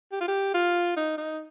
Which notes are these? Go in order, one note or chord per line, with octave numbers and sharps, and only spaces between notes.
G4
F4
G4
F4
D#4
D#4